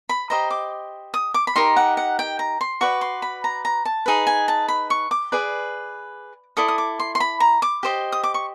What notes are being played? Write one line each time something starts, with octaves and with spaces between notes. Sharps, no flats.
B5
G4 C5 D#5 A#5
D6
D#6
D6
B5
D#4 G4 A#4 C6
F#5
F#5
G5
A#5
C6
F#4 B4 D5 C#6
C6
B5
A#5
A#5
A5
D#4 G#4 B4
G#5
A5
B5
C#6
D6
G#4 B4 D5
E4 A4 D5 D#6
D#6
D6
C6
C6
B5
A#5
D6
G4 C5 D#5
D#6
D6
C#6